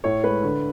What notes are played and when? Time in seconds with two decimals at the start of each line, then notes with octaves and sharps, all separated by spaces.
0.04 A2 C#5
0.24 G#3 B4
0.43 D3